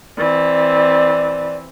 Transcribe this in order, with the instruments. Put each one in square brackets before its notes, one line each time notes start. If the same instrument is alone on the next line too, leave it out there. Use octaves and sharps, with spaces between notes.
[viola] E3 C4 [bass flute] D5